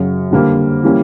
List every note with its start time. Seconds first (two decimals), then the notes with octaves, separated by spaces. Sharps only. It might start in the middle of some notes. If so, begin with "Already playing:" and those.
Already playing: F#2 C#3 F#3
0.31 F2 D3 G3 A#3
0.83 E3 G3 A#3 C#4